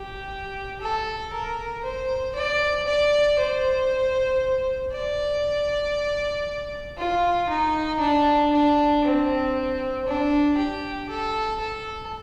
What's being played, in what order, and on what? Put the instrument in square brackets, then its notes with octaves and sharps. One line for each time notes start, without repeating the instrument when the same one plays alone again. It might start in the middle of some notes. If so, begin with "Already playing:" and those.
Already playing: [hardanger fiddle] G4
A4
A#4
C5
D5
D5
C5
D5
F4
D#4
D4
D4
C4
D4
G4
A4
A4